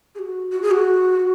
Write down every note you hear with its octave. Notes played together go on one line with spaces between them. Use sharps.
G#4
F#4
F#4
G#4
F#4